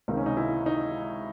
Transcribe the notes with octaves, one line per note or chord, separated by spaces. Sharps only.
C#2 C3 D#3 D#4
C#4
D#4
E4
D#4